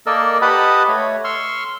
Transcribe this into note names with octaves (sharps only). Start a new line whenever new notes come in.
A#3 A4 A#4 D5 D#5 E6
G4 B4 D#5 F#5 A5 B5
A3 C#5
C6 C#6 E6 F6